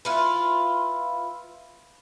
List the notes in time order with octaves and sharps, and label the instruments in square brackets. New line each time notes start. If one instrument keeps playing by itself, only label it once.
[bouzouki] E4 F4 B4